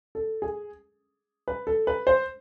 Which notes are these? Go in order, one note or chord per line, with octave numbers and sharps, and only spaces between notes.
A4
G#4
B4
A4
B4
C5